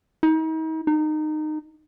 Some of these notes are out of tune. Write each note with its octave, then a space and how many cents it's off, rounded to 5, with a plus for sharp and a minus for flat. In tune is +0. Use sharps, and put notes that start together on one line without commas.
D#4 +40
D#4 -20